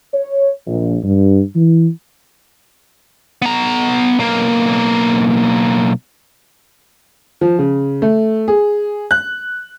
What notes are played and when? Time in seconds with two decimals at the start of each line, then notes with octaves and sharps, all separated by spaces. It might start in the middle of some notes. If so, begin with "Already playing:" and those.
0.14 C#5
0.67 A#1
1.03 G2
1.55 E3
3.42 B3 A#5
4.19 B1 A#3
7.41 F3
7.59 C#3
8.02 A3
8.48 G#4
9.11 F#6